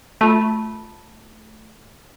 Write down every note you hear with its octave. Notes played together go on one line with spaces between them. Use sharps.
A3 F4 A5